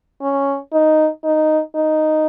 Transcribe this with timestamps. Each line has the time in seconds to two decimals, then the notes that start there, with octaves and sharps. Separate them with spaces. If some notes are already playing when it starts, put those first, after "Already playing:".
0.22 C#4
0.72 D#4
1.24 D#4
1.75 D#4